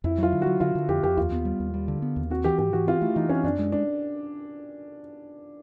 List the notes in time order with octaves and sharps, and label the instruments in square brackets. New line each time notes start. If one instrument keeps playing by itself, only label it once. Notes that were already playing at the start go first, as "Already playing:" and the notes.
[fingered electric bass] F2 [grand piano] E4
[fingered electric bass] F#3 [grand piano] F4
[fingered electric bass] D3
[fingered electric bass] F#3 [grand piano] F#4
[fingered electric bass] D3 [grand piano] F4
[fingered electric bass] D3
[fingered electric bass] F2 [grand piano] G4
[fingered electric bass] F2 [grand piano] G4
[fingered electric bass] D#2 [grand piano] F4
[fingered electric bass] B3
G3
D#2
G3
D3
B3
D#2
[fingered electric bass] C4 [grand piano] F#4
[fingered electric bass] E3 [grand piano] G4
[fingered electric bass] G#2 [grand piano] G4
[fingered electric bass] E3 [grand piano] F#4
[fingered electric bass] C4 [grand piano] F4
[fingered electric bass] A3 [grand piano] E4
[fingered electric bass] E3 [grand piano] D#4
[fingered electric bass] C4 [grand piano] C#4
[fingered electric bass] F#2 [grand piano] D4
[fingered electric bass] G#3
[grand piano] D4